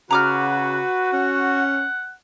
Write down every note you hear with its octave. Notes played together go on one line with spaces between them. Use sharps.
C#3 F#4 B4 A#5 D6 F6
C#4 F#5